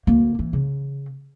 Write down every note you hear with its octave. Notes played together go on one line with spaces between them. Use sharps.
D2 A#3
E3
C#3